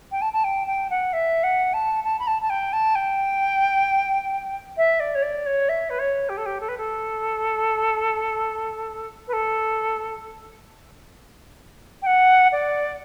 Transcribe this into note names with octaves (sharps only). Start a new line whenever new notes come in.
G5
A5
A5
G5
G5
F#5
E5
F#5
A5
A5
B5
A5
A5
G5
A5
G5
E5
D5
C#5
D5
C#5
E5
B4
C#5
G4
A4
G4
A4
B4
A4
B4
A4
G5
F#5
D5